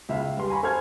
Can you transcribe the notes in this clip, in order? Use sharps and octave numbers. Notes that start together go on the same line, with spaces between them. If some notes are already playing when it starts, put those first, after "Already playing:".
C#2 E5 F5
G3 B4 C6
G#5 A#5 B5 C#6
A4 C5 G#5 F6 G#6